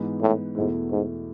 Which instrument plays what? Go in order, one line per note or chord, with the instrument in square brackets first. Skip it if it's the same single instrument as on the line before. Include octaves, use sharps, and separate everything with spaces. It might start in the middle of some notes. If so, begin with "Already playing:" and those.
Already playing: [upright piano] G#2 E3 B3
[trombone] A2
[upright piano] E2 B2 A3 E4 [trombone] G#2
[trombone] G#2